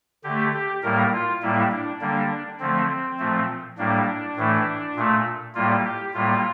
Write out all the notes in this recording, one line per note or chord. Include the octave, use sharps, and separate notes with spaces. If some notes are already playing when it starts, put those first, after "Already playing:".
D3 A3 G4
G4
A2 G3 A#3 A#4
F4
A2 G3 A#3 E4
D4
D3 G3 A#3 D4
D3 F3 A3 C4
A#2 F3 A3
A2 G3 A#3 D4
A2 E3 A3
A#2 A3
A2 G3 A#3 F4
G4
A2 G3 A#3 F4